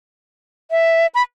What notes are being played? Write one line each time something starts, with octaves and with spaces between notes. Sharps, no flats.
E5
B5